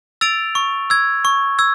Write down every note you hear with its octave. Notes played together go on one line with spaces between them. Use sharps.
E6 A6 D7 F7
C#6
E6 G#6
C#6
E6 G#6